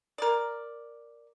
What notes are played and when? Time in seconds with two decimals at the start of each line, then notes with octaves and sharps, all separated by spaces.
0.18 A#4 D5